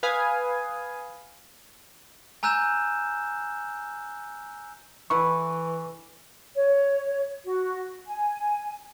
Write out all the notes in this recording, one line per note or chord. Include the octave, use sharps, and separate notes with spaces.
B4 F5 G#5 D#6
G#5 A#5 E6 F#6 G6 E7
D3 E3 E4 B4 C#6
C#5
F#4
G#5